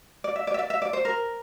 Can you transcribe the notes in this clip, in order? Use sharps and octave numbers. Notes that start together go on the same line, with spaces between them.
D5
E5
D5
E5
D5
E5
D5
C5
A#4